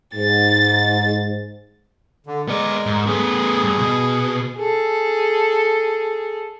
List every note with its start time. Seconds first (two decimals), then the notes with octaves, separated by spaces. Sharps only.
0.15 G#2 A6
2.27 D3
2.48 G#3 B3 A#4 D5
2.86 G#2
3.07 A3 B3 G#4
3.63 G2
3.79 B2
4.56 G#4 A4